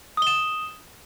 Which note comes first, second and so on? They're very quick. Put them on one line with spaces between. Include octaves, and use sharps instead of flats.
D#6 G7 E7